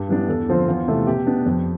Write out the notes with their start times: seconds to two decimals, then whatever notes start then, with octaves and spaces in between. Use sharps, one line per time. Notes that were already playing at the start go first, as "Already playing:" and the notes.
Already playing: G2 G4
0.08 E3 G3 B3 D4
0.28 E2 A4
0.49 D3 F3 C4
0.68 E2 F4
0.88 C3 E3 A3
1.07 B2 G4
1.26 B3 D4
1.46 F2 G4